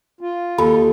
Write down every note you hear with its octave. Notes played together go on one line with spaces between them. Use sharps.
F4
D#2 A4 B5